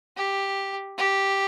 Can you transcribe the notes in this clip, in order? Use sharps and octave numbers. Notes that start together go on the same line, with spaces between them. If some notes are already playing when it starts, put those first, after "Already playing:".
G4
G4